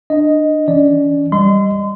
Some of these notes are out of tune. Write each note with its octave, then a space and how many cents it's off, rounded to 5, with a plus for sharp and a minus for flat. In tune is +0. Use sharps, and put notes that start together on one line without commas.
D4 +25 D#5 +0
E3 +0 C#4 +40 D5 +0
G3 +0 D#5 +0 C6 -30